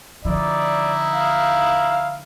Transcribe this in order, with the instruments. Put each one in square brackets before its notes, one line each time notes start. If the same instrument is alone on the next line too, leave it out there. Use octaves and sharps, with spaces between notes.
[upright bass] D3 F3 [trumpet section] D#4 E4 [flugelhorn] D5
[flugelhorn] F5